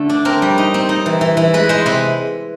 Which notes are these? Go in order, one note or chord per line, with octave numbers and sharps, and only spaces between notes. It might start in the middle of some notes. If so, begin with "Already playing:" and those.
Already playing: D3 A3
D4
C4 A#4
G3
D#4
C4
D#4
E3
E3
E3
G#3 B4
G#3 C5
C3 B4